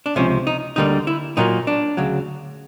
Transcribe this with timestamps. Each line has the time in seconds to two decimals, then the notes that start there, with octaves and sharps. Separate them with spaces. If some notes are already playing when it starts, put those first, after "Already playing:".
0.06 D4
0.16 C#2 C3 F3 C#4
0.47 D#4
0.76 D2 D3 G3 A#3 D#4
1.07 E4
1.37 A#2 F#3 A#3 D#4
1.67 D4
1.97 D2 C#3 F#3